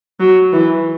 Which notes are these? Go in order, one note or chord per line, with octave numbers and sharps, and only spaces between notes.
F#3
E3